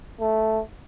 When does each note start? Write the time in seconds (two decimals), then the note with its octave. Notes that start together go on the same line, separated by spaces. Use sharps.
0.20 A3